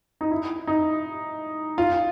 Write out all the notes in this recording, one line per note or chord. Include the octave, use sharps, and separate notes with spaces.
D#4
E4
D#4
F4